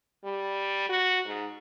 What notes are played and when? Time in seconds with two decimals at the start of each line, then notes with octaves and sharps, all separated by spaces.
0.24 G3
0.89 F#4
1.26 G#2